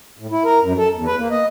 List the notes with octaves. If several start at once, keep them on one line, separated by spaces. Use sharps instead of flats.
A2
E4
A#4
F#2
A4
E2
B4
A#3
D#5